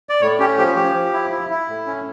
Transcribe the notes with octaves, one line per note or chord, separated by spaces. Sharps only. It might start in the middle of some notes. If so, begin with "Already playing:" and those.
D5
A2 C#5
C#4 G4
F3 G4
F3 G4
F3
E4
E4
E4
A2
C#4